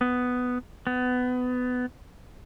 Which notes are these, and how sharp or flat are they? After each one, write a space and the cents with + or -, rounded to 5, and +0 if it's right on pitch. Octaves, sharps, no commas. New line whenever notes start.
B3 +10
B3 +20